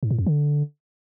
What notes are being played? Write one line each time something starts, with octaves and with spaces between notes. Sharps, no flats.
G#2
A2
F2
D3